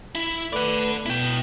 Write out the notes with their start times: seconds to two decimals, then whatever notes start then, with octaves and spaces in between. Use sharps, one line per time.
0.15 E4
0.53 A3 B4 D5 F#5
1.06 B2 E4 G5